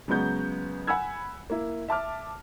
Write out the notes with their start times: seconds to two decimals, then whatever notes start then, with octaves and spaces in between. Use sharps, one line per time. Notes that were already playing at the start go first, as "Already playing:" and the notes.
0.08 C#3 F#3 G#3 B3 G6
0.87 F#5 G#5 B5 E6 G#6
1.50 A#3 E4
1.88 E5 A5 D6 F6